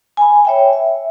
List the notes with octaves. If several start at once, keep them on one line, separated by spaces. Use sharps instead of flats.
G#5 B5
C#5 E5 G5
E5